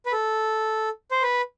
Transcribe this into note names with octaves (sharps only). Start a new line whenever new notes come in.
B4
A4
C5
B4